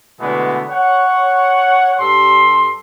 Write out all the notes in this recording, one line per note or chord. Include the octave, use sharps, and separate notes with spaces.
B2 D3 E3 G#3 A3 B3
C#5 F#5
G2 G3 A4 C6